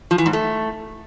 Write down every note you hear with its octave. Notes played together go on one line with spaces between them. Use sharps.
F3
E3
G#2
A3